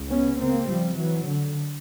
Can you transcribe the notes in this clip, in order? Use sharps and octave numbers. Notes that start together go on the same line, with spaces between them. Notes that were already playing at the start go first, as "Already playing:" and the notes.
Already playing: C#2 C#3
B3 C#4
A#3 C4
F3 G3
E3 F#3
D3